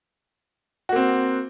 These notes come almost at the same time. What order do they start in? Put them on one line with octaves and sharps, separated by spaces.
F#4 A#3 C4